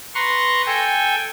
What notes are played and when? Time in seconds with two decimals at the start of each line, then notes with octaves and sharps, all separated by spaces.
0.15 B4 A#5 C6 C#6
0.66 A4 G5 G#5